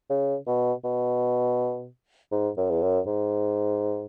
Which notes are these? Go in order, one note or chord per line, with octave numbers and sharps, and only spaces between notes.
C#3
B2
B2
G#2
F#2
E2
F#2
G#2